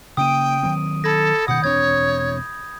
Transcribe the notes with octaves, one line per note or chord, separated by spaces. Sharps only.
C#3 A#3 G5 D#6 D7 D#7
D#3 F#3 C4
A4 B5 G#6 A#6
B2 D#3 F#5 D#6 G6
E1 C4 D4 C#5 G#6